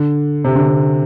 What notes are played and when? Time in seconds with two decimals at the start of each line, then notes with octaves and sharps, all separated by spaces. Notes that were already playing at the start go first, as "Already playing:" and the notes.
Already playing: D3
0.45 C3
0.55 D3
0.68 C3